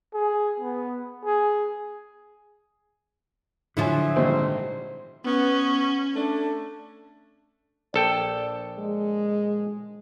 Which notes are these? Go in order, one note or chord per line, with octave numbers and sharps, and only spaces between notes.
G#4
B3
G#4
D3 F3 F#3 E4 E5 G#5
G#1 A#2 G3 C5
B3 C#4
A3 D4
A#1 A4 D5 G5
G#3